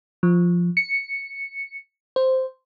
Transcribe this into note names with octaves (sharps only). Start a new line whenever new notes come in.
F3
C#7
C5